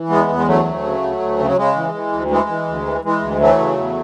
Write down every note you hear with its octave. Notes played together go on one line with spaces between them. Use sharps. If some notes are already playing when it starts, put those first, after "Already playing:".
Already playing: E3
E2 G#3 B3
E2
G#3
D2 F#3 A3
D2
C#3
D2
D2
C#3
F#3
C#3 G#3
E3
E3
D2
E3 G#3
E3
D2
E3
E3 G#3
D2
E3 F#3 A3
C#3
E2